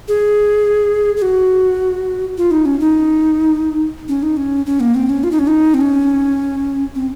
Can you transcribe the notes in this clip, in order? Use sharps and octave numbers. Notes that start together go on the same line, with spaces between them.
G#4
G#4
F#4
F4
D#4
C#4
D#4
C#4
D#4
C#4
C#4
A#3
C4
C#4
F4
D#4
C#4
D#4
C4
C#4
C4